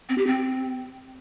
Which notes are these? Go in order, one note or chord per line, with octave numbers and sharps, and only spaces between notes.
C4
G4
C4